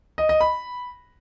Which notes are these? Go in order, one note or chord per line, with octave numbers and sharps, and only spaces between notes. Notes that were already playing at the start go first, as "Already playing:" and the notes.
D#5
D#5
B5